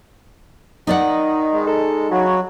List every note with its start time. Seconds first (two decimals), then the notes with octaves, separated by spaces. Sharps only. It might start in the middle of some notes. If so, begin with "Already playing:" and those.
0.87 D#3 D#4 D5 F#5
1.52 G#3
1.67 A4
2.11 C#3 F#3 F#4